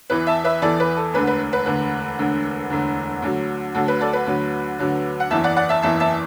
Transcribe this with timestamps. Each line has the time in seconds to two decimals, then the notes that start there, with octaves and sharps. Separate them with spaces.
0.10 E2 E3 B4
0.27 E5 A5
0.44 B4 E5
0.62 E2 E3 A4 D5
0.80 B4
0.96 A4
1.13 E1 D2 D3 B4
1.27 B4
1.53 B4
1.66 E1 D2 D3 B4
2.18 E1 D2 D3
2.70 E1 D2 D3
3.22 D2 D3 F#3
3.75 D2 D3 F#3 A4
3.88 B4
4.01 A4 D5
4.13 B4
4.26 D2 D3 F#3
4.79 D2 D3 F#3
5.20 F#5
5.30 F#1 E2 E3 E5 A5
5.44 D5 F#5
5.56 D5 F#5
5.69 E5 A5
5.82 F#1 E2 E3 E5 A5
6.00 E5 A5